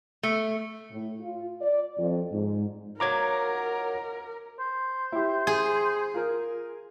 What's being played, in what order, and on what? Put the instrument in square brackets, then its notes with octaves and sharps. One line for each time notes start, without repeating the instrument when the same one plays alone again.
[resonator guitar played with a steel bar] A3
[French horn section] A2
F4
D5
F2
G#2
[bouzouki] F#3 D#4 F4 [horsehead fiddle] A#4 [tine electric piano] A#5 D6 G#6
[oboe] C5
[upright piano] E4 G4
[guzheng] G#4
[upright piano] F4 A#4